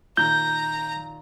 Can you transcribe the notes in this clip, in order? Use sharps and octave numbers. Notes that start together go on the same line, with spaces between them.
A#2 D#3 A#5 G6